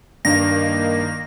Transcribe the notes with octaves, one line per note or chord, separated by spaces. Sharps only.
G2 D#3 A#3 A#6